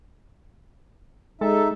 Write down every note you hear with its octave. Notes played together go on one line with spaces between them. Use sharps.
G#3 D#4 A4 E5